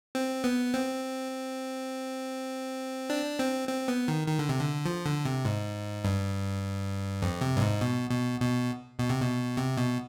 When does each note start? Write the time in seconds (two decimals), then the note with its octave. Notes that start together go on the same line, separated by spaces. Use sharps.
0.15 C4
0.44 B3
0.74 C4
3.10 D4
3.39 C4
3.69 C4
3.88 B3
4.08 D#3
4.28 D#3
4.39 D3
4.49 C3
4.61 D3
4.86 F3
5.06 D3
5.25 C3
5.45 G#2
6.04 G2
7.22 F2
7.41 C3
7.57 G2
7.62 G#2
7.81 B2
8.10 B2
8.40 B2
8.99 B2
9.10 C3
9.21 B2
9.57 C3
9.77 B2